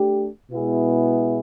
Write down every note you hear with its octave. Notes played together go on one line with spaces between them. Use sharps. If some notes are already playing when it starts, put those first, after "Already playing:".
Already playing: A3 D4 G4
B2 G#3 B3 E4 G#4